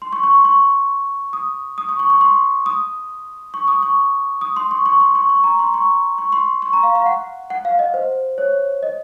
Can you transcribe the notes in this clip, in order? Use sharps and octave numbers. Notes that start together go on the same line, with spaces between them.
C6
C#6
C#6
C6
C#6
D#6
D#6
C#6
C#6
C#6
C6
D#6
C#6
D#6
C#6
D#6
C6
C#6
C#6
C6
C#6
C#6
A#5
C6
C#6
C#6
C6
C#6
A#5
F5
F5
F#5
F#5
F5
D#5
C5
C#5
D#5